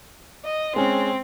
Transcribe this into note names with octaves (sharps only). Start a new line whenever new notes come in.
D#5
G#3 C4 C#4